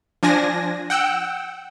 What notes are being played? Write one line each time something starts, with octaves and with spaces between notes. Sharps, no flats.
F3 D4 G#5 A#6
F#5 G5 E6